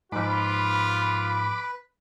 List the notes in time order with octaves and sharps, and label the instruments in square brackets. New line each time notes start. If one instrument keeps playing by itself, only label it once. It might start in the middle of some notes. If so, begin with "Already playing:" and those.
[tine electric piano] G#2 F3 [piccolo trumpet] F4 [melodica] B4 [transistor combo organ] B5 D6